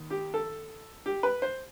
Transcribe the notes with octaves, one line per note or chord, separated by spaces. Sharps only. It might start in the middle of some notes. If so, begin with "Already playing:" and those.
Already playing: D#2 D#3
G4
A4
G4
B4
C5